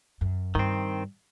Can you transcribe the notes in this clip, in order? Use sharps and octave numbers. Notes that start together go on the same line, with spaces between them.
F#2
G2 D#3 C4